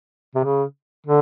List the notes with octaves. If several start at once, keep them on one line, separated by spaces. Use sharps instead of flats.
C3
C#3
D3